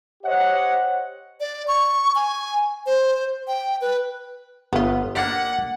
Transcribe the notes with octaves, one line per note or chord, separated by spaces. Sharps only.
G4 C5 C#5 D#5 F#5
D5
C#6
G#5
C5
G5
B4
G1 B3 F4 B4
A#3 D4 G4 F#5